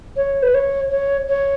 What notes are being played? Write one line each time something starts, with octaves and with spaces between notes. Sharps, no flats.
C#5
B4
C#5
C#5
C#5